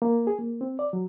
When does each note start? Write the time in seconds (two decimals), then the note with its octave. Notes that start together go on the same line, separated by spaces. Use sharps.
0.02 A#3
0.27 G#4
0.39 A#3
0.61 C4
0.79 D5
0.93 F#3